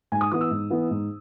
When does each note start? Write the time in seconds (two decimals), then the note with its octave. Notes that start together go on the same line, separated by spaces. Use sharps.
0.12 G#2 G#5
0.21 D#6
0.32 E3 B3 D#6
0.41 E6
0.51 G#2
0.70 E3 B3
0.91 G#2